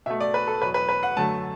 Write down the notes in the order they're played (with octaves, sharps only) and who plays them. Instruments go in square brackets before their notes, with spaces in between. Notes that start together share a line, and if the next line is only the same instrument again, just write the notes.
[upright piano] B2 E5
A3
D5
B4
A4
E2 B2 F#3 B4
B4
B4
F#5
F#2 D3 F#3 A3 A5